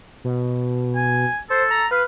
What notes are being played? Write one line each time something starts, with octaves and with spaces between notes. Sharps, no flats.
B2
G#5
A4 C5
A#5
B4 F5